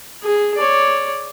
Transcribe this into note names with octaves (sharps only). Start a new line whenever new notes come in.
G#4
C#5 D5